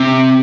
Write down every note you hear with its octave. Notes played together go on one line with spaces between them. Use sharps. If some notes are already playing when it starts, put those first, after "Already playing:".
Already playing: C3